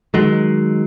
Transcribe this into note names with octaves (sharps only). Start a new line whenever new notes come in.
D#3 F#3 G#3